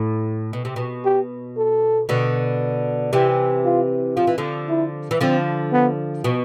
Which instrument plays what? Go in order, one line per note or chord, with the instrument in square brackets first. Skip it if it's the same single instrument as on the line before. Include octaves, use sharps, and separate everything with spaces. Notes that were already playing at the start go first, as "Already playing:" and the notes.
Already playing: [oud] A2
B2
C3
B2
[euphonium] G4
A4
[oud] B2 D3
[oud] C3 E3 [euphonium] G4
[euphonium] F4
[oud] F3 [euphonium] F4
[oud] E3
D3 F3
[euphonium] E4
[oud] E3
[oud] D3 F3 [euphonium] C4
[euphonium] B3
[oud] B2